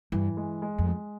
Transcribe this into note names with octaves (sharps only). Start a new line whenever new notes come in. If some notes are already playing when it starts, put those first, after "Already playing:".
G2 E3
G#3
G#3
F2
G#3